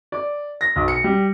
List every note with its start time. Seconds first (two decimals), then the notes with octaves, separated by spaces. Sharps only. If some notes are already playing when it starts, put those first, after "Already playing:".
0.12 D5
0.61 A#6
0.76 B1
0.88 C#7
1.04 G3